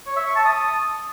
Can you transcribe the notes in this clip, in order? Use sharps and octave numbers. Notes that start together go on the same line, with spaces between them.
C#5
E5
C#6
A5
D#6